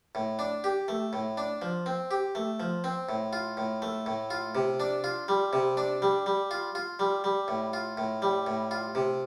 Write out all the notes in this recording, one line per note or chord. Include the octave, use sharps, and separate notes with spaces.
A2
D4
G4
A3
A2
D4
F3
C4
G4
A3
F3
C4
A2
F4
A2
A3
A2
F4
C3
D4
F4
G3
C3
D4
G3
G3
F4
F4
G3
G3
A2
F4
A2
G3
A2
F4
C3